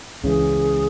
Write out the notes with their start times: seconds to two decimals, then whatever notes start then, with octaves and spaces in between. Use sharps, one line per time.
0.23 C#2 C#3 E3 G#4